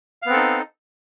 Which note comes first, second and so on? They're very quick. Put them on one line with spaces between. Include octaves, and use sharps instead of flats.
F5 B3 C4 A4 D#4